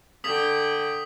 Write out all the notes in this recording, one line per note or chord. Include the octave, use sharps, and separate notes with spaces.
D3 G5 D#6 B6 F7